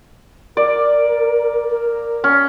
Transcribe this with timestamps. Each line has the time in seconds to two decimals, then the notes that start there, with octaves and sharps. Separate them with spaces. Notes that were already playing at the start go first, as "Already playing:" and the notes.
0.57 A#4 D5
1.70 A#4
2.24 C#4